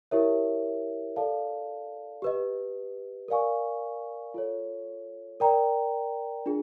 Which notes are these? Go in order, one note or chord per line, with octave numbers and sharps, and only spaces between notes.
E4 G4 A#4 C#5 E5
A4 D5 F5 A5
G4 B4 D#5
A#4 D5 F5 G#5 C#6
F4 A4 C#5
A#4 D5 G5 A#5
D4 F4 G#4